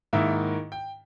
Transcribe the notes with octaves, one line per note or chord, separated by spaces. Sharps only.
G#2 D#3 A#3 E4 E5
G5